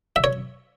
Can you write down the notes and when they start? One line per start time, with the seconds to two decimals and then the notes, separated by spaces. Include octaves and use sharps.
0.16 E5
0.24 C#5